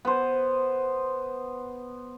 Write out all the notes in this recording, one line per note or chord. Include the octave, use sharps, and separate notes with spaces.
B3 C5